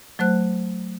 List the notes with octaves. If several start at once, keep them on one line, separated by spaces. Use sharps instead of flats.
F#3 A3 C5 F#6